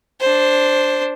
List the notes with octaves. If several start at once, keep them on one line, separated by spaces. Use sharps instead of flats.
D4 C5